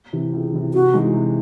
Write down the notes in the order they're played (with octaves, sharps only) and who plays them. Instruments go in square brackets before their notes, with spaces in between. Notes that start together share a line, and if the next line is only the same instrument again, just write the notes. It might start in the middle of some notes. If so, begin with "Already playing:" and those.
[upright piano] C3 E3
C#2
C3 E3
[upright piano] C3 [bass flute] F#4
[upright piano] E3 G#3 D#4
C3